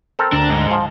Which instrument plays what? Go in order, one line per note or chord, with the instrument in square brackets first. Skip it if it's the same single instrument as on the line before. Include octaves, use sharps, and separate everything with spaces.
[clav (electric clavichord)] C4 A4 A#4
[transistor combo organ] D2 A#5 [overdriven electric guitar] D4
[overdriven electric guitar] G#2
[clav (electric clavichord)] F3